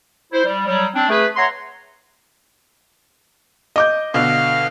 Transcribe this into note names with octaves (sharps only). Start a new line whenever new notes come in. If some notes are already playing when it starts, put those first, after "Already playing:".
E4 C5
G3
F#3 G3
C4 D4
A3 G#4 B4
C#5 E5 F#5 A#5 C6
D#5 D6 G6
B2 D3 F5